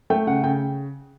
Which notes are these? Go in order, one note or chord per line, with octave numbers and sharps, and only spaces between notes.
A3 G5
C#3 F#5
C#3 G5